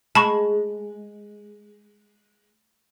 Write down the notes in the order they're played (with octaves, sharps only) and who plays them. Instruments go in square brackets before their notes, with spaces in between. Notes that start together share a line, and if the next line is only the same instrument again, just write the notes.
[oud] G#3 [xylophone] A5 B5 C#6